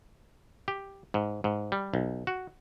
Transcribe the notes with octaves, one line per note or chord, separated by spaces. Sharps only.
G4
G#2
G#2
G3
B1
F#4